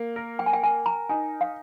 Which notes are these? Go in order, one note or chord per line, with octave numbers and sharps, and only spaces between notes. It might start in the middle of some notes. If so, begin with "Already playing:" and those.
Already playing: A#3
A#4
G5
G#5
G5
A#4 G#5
A#5
D#4 G#5
F5